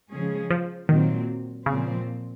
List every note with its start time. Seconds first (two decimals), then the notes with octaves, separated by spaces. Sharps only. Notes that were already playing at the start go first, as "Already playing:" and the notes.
0.11 C#3 F3 G#3 C#4 G#4
0.50 F3
0.89 A#2 D#3 F#3 C4
1.66 A#2 C#3 F3 C4